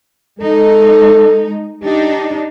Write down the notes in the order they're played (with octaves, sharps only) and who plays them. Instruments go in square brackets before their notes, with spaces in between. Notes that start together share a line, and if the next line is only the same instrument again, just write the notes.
[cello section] G#3 D#4 [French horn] A4
[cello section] D4 D#4 [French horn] G4